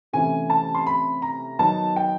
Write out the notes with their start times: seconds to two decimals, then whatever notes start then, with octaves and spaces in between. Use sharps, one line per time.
0.13 C3 E3 A3 C#4 E4 G#5
0.50 A5
0.75 C6
0.87 B5
1.22 A#5
1.59 D#3 F#3 B3 D#4 A5
1.96 G5